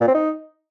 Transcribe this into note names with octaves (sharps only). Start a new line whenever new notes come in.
A#2
C4
D#4